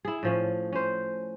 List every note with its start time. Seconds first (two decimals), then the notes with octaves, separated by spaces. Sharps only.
0.05 E4 G#4
0.23 A2 F3 C#4
0.72 C#4 C5